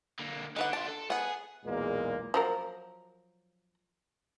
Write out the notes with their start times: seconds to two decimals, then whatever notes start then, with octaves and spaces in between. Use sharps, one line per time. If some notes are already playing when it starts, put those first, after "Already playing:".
0.19 D3 A#3
0.56 D3 D#4 B4 F#5
0.73 D4 F4 A5
0.88 A4
1.10 B3 G#4 F#5
1.65 B1 E2 A#2 G#3 A#3
2.34 F3 F#3 A#4